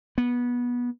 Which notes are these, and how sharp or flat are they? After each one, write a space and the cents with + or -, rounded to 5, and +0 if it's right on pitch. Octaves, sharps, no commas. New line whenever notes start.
B3 -20